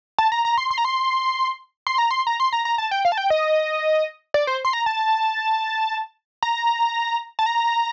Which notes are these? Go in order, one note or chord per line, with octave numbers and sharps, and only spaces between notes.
A5
A#5
A#5
C6
C6
A#5
C6
C6
A#5
C6
A#5
C6
A#5
A#5
A5
G5
F5
A5
G5
D#5
D5
C5
C6
A#5
A5
A#5
A5
A#5